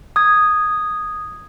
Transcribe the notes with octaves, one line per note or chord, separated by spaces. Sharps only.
D#6 G#6